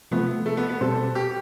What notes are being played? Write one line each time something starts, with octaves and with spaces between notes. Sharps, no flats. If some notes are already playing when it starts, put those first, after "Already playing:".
C3 F3 A3 B3
A3
B3
B3
B2 G3 C4 G4 A4 C5
G4